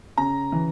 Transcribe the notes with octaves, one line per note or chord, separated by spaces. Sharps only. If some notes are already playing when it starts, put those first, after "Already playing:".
C#3 A#5
E3